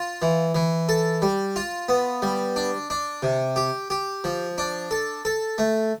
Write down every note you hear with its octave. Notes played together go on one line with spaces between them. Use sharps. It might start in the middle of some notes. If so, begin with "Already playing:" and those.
Already playing: F4
E3
E3
A4
G3
F4
B3
G3
D4
D4
C3
G4
G4
F3
D4
A4
A4
A3